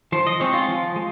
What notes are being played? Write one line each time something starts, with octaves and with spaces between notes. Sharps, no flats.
F3 C5
D#5
G#3 C4 C#5
F4
F3
G#3